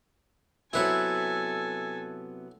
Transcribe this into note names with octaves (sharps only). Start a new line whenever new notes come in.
C3 F#3 B3 E4 A4 B4 C#5 G#5